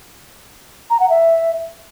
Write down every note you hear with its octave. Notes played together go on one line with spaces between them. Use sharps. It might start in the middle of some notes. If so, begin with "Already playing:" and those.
A#5
F#5
E5